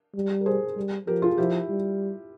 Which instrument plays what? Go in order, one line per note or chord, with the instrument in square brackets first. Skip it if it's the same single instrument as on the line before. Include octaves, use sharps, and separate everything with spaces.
[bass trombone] G3
[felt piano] A#4
G#4 C5
[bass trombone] G3
[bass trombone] F3 [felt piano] G4 A#4
[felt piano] F4 G#4
[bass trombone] F3 [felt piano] E4 G4
[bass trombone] G3